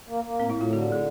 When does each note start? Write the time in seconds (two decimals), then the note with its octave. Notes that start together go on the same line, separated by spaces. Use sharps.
0.08 A#3
0.24 A#3
0.39 A2 C4
0.50 E4
0.55 A2
0.61 F4
0.70 D3 F#4
0.81 G4
0.92 G#4